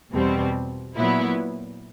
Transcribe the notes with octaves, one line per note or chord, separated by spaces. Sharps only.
E2 B2 G3 C4
A#2 F#3 B3 E4